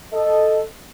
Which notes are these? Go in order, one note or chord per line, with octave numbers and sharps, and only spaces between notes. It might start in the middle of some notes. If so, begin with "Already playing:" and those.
A4 D#5